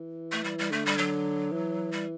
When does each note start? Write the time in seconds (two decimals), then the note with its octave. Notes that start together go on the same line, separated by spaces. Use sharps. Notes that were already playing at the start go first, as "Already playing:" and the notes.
Already playing: E3
0.32 A3
0.44 G3
0.58 G3
0.71 D3 A3
0.86 G3
0.98 F#3
1.52 E3
1.92 G3